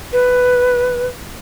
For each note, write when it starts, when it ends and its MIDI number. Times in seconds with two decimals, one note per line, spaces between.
0.13 1.06 71